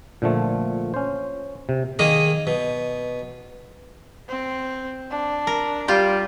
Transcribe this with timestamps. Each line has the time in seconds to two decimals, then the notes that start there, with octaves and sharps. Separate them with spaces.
0.22 A#2 D3 F3 A3
0.94 C#4 C5
1.69 C3
1.99 D#3 A#3 G#4 D#5
2.47 B2
4.29 C4
5.11 D4
5.47 A#4
5.88 G3 F4 G4